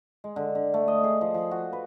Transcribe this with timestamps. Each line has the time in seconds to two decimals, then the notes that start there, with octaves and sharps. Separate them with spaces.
0.24 G#3
0.36 D3
0.55 D3
0.74 A3
0.88 D#5
1.04 G#4
1.21 F3
1.34 F3
1.51 F#4
1.73 B4